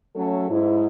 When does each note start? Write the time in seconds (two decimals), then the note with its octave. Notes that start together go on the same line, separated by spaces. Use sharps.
0.15 F#3 A3 C#4 A4
0.49 G#2 E4